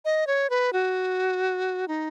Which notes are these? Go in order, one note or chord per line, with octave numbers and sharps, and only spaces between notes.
D#5
C#5
B4
F#4
D#4